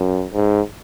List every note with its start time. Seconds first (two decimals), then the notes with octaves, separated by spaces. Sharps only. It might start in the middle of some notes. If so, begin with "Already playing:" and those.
Already playing: F#2
0.34 G#2